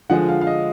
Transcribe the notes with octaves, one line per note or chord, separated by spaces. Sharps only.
D3 F3 G#3 F#5
F5
F5
D#5